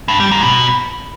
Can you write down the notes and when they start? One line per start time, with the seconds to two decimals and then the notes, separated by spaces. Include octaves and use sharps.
0.08 G2
0.20 G3
0.31 G#2
0.43 B2